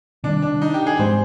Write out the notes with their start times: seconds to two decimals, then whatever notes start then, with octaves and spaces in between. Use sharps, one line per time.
0.24 C3 D#3 G3 D4
0.42 D4
0.61 D#4
0.74 G4
0.87 G#4
0.99 G#2 F3 G#3 C4 C5